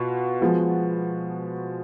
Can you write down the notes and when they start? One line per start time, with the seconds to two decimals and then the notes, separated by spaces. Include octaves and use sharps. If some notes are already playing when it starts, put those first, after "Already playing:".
Already playing: B2 F4 B4
0.41 F3 G#3 B3 F#4